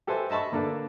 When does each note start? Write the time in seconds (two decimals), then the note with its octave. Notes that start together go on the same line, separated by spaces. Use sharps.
0.07 G4 A4 B4 C5 E5 G#5
0.30 D#5 E5 A5 B5 C#6
0.52 D3 A#3 D4 A4 B4